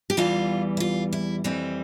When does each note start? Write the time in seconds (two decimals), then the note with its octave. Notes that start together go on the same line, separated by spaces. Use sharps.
0.10 G4
0.17 E2 E3 G3 F4
0.77 E4
0.80 F4
1.13 E4
1.44 F2 E3 G3 C4